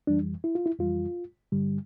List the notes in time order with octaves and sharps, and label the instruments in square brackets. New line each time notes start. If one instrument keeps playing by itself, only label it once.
[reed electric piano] F2 E3 G3 D4
E4
F4
E4
F2 E3 G3 F4
G2 D3 G3